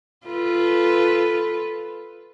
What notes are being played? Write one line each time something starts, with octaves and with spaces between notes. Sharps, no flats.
F4 A4 B4